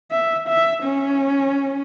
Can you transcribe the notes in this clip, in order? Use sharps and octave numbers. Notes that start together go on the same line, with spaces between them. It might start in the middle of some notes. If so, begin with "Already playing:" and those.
E5
E5
C#4